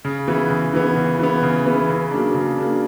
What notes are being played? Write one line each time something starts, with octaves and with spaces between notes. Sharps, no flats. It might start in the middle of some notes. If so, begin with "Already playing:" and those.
C#3
E3 B3
C#3
E3 B3
C#3
E3 B3
C#3
E3 B3
C#3
F#3 A#3 D4
C#3
F#3 A#3 D4